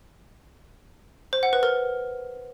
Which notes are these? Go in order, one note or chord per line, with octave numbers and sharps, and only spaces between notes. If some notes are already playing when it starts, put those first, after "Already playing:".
C5
F#5
B4
A#4